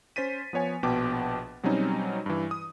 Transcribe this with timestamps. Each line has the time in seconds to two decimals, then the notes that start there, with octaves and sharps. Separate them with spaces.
0.16 C#4 C5 A6 B6 D#7
0.53 F3 B3 C#5 G#5
0.83 A#1 B2 B3 G5 A5 D6
1.63 B2 F#3 G3 C4 C#4 D#4
2.26 G2 E3
2.51 D#6